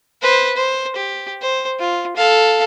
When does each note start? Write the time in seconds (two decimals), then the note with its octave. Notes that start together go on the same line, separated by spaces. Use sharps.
0.22 B4 C5
0.56 C5
0.96 G4
1.42 C5
1.80 F4
2.17 A4 F5